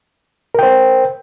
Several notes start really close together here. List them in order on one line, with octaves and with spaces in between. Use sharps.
A#4 G5 C5